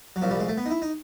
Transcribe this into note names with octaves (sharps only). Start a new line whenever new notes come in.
F#3
C2 A#2 F3
G3
G#3
A3
B3
D#4
E4
D#4